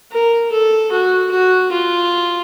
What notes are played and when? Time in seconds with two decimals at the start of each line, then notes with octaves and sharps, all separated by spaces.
0.12 A#4
0.52 A4
0.92 F#4
1.32 F#4
1.72 F4